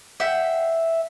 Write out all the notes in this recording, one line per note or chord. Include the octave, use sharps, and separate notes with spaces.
E5 F#5 G5